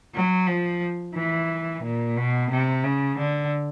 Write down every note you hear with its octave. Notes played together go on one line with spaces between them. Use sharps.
F#3
F3
E3
A#2
B2
C3
C#3
D3